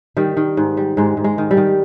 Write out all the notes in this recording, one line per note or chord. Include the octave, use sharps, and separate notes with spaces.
D#3 G3
D#3
G#2
G3
G#2 G#3
G#2
G#3
D#3
G3
D#3